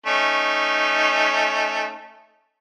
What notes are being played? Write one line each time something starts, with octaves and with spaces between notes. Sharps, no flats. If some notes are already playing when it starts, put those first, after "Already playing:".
A3 C#4 D#4